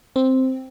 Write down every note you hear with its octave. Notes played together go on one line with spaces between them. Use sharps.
C4